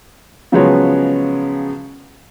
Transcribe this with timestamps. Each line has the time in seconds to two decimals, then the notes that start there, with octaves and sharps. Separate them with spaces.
0.52 C#3 F3 F#3 G#3 B3 C#5